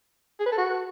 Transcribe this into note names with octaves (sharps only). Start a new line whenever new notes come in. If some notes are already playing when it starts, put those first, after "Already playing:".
G#4
B4
A4
F#4